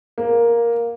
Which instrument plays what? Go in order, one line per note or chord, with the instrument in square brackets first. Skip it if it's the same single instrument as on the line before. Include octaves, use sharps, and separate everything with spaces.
[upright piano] A#3